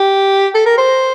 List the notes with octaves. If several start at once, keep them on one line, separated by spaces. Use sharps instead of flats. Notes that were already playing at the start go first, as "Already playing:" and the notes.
Already playing: G4
A4
A#4
C5